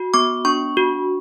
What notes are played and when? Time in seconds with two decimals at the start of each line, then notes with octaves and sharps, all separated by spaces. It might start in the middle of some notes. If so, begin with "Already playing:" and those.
Already playing: F#4
0.14 B3 D6
0.45 D4 C#6
0.77 F#4